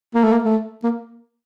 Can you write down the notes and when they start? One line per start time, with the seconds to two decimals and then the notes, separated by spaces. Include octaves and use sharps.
0.14 A#3
0.24 A3
0.32 A#3
0.44 A3
0.84 A#3